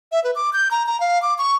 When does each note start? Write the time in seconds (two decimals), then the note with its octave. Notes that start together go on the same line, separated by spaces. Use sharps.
0.12 E5
0.24 B4
0.35 D6
0.53 G6
0.71 A#5
0.86 A#5
1.00 F5
1.22 D6
1.38 C#6